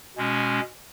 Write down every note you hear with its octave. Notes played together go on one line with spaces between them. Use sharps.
B2 G#3 C#4